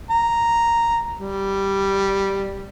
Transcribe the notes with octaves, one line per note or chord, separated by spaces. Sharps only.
A#5
G3